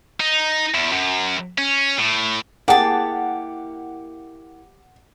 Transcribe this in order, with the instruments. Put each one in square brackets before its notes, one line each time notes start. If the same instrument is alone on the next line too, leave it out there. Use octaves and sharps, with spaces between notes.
[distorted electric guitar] D#4
E2
F#2
C#4
A2
[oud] A#3 E4 G#4 [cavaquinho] G4 A5 [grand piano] F#5